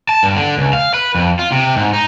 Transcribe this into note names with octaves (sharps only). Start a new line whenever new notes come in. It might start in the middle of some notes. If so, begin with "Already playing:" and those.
A5
G2
D3
C#2
F5
B4
F2
F4
C3
G#2
D#4